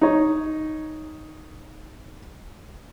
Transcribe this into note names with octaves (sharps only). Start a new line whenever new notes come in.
D#4 C#5